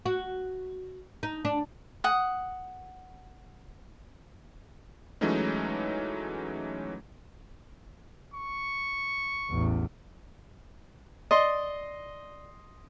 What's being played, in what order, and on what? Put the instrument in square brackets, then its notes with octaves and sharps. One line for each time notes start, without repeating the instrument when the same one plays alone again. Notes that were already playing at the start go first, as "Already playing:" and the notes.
[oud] F#4
D#4
D4
[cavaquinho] F#5 D#6
[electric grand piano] E3 F#3 G#3 A3 C#4 D#4
[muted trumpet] C#6
[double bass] A1 E2
[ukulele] D5 [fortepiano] D#5 C6